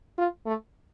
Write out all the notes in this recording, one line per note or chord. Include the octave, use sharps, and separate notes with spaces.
F4
A3